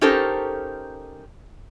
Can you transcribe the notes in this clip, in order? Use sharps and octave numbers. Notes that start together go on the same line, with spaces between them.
C#4 D#4 G4 A4 A#4 C5